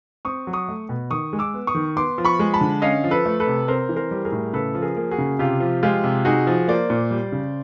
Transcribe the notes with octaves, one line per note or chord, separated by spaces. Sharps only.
C4 C#6 D#6
F#3
C#6 D#6
A3
B2
D#3 C#6 D#6
G#3
D6 E6
B3
C#6 D#6
D#3
B3 C6 D6
F3
B5 C#6
G#3
A5 B5
D3
C#4 D#5 F5
F3
A4 B4
A3
A4 B4
C3
C4 A#4 C5
E3
A#4 C5
G3
G#4 A#4
A2
C#3 A4 B4
F3
G#4 A#4
A#3
F#4 G#4
C#3
C3 F4 G4
F3
G#3 F4 G4
C3
D#4 F#4 G#4
F3
A#3 C5 D5
A#2
G3
C#3